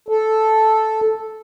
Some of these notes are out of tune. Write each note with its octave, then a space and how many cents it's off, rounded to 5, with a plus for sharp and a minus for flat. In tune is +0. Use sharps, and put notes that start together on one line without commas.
A4 -5